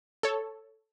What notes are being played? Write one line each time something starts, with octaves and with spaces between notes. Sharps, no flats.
A4 C#5